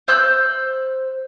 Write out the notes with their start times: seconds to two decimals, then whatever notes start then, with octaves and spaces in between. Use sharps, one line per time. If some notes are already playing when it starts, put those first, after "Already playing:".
0.08 C5 E6 F#6 G6